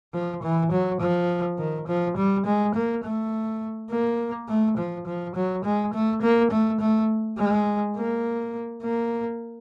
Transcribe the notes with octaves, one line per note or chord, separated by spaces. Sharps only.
F3
E3
F#3
F3
D#3
F3
G3
G#3
A#3
A3
A#3
A3
F3
F3
F#3
G#3
A3
A#3
A3
A3
G#3
A#3
A#3